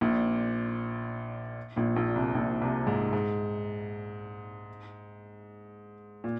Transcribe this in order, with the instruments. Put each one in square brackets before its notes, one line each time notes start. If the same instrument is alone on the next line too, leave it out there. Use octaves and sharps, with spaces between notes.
[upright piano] A#1 A#2
A#1 A#2
A#1 A#2
C2 C3
A#1 A#2
C2 C3
G#2
G#2
A#2